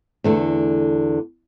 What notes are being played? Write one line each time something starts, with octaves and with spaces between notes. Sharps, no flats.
E2 D3 A3